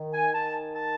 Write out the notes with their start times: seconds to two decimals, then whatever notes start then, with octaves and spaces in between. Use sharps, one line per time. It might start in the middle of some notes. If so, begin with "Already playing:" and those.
Already playing: D#3
0.14 G#5
0.34 D#3 A5
0.75 A5